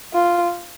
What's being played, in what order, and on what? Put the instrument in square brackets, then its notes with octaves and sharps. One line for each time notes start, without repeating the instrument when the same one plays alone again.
[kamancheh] F4